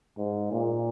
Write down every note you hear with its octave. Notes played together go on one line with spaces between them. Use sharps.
G#2
A#2